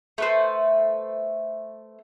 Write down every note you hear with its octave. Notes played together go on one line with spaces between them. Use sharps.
A3 B4 C5